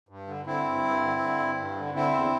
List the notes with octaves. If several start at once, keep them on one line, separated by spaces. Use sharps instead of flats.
G2
D3
D3 C4 E4
G2
G2
D3
D3
G2
G2
D3
D3 C4 E4
E2